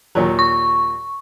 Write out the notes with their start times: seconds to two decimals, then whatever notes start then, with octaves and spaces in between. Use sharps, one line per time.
0.15 D#2 A#2 F#3
0.39 C#6